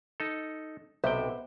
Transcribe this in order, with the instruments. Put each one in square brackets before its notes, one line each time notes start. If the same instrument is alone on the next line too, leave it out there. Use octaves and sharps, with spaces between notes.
[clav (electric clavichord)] D#4 A4
[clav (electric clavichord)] B1 C3 G5 [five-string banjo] B3 C5 E5